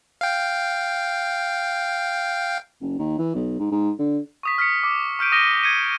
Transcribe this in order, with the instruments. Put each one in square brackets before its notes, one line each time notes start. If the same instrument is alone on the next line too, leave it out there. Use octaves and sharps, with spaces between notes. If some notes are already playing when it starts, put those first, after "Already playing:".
[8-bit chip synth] F5 G5
[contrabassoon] F#1
D#2
E3
B1
G#2
G#2
D3
[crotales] C#6 D#6 B6
F6 B6 C#7
D6
C#6 F6 G6 D7 D#7
D#6 A#6 D#7 G7
G#6 C#7 D#7